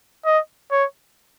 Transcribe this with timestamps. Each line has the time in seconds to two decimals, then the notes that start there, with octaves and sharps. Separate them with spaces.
0.26 D#5
0.71 C#5